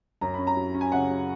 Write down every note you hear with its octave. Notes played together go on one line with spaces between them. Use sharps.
F#2 A#5
C#4 B5
A#5
F#3
C#4
G#5
C#3 F#5
F#3